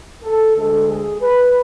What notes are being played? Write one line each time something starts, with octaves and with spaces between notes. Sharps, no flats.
A4
D2 D3 G#3 A4
G#4
B4